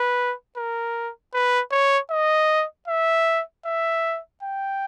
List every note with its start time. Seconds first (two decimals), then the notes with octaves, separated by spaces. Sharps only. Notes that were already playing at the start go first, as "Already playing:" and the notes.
Already playing: B4
0.57 A#4
1.34 B4
1.72 C#5
2.10 D#5
2.88 E5
3.66 E5
4.43 G5